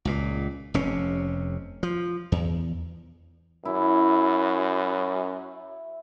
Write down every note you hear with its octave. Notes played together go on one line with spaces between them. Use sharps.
C#2 A#2
F1 C3 C#4
F3
E2
F#2 E4